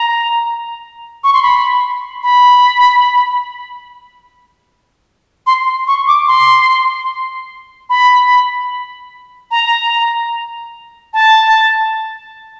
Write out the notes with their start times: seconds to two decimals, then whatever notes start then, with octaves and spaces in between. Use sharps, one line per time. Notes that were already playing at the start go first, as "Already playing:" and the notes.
Already playing: A#5
1.24 C#6
1.33 C6
1.43 B5
2.23 B5
5.47 C6
5.87 C#6
6.08 D6
6.28 C6
7.90 B5
9.51 A#5
11.13 A5